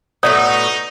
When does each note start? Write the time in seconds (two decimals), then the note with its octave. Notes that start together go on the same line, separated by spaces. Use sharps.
0.23 A2 F#3 B3 D#4 C#5 D5 E5 D#6